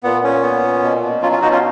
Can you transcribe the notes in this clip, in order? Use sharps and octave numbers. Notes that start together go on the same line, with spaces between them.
A#2 B3
A#2 C#4
B3
A#2
B2
B2
F#3 C#4 F4
C#4 F4
B2 D#4 F#4
C#4 F4